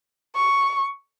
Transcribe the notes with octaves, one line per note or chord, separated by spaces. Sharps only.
C#6